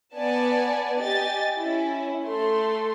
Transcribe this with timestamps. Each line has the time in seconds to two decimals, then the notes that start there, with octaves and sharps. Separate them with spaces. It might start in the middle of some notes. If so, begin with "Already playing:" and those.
0.14 B3 D5 G#5 A5
0.98 G4 D#5 G#5 A6
1.62 C#4 E4
2.26 A3 A4 C6